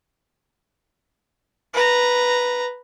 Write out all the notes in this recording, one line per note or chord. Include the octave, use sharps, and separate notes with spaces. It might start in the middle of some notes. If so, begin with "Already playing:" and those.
B4 A#5